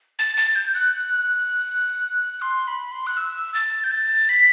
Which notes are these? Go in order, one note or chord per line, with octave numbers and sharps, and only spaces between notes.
A6
A6
G6
F#6
C6
B5
C6
F#6
E6
A6
G6
A6
B6